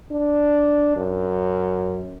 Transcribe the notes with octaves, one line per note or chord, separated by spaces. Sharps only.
D4
F#2